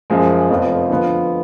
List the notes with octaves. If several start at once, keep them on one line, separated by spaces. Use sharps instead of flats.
F#2 F3 G#3
F1 F2 F3 B3 F4
D3 F3 B3 F4